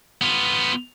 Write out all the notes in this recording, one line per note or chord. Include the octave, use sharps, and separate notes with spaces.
B3 F4